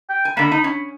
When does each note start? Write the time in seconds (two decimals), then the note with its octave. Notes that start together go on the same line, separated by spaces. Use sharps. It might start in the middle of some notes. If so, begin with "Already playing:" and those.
0.10 G5
0.25 G#5
0.37 D3 A#3 B5
0.52 D#4
0.64 C#4